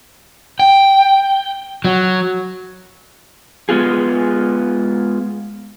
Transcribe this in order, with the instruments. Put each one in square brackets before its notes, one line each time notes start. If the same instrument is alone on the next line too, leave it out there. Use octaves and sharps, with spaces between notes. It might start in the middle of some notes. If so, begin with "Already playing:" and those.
[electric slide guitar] G5
F#3
G#3 B3 F4 G#4